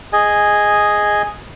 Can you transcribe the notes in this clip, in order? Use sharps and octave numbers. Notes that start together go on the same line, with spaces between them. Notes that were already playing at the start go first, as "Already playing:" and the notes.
G#4 D#5 G#5